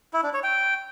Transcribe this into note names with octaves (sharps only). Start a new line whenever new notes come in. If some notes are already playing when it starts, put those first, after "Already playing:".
E4
D4
C#5
G5